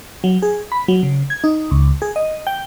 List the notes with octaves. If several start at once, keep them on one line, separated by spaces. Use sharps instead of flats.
F#3
G#4
B5
F#3
C#3
G#6
D#4
C#2
G#4
D#5
G5